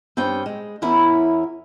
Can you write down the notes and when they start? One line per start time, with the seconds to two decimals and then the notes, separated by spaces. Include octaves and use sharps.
0.17 G2 C4 C#4 G5
0.46 G#3
0.82 E2 C#4 E4 A#4 E5